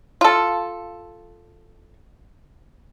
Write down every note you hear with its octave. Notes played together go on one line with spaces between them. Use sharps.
F4 A4